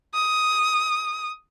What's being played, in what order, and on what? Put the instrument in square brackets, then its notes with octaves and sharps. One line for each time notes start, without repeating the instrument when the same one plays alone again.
[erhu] D#6